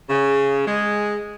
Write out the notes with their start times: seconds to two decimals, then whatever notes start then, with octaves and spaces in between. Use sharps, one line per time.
0.09 C#3
0.66 G#3